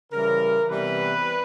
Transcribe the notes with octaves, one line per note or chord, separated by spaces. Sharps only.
C#3 E3 G3 A#4
C3 E3 G3 B3 B4